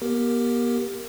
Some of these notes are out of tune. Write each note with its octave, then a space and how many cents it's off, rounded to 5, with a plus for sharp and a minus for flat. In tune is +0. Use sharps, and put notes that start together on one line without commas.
B3 -45 G4 +0 A#4 +0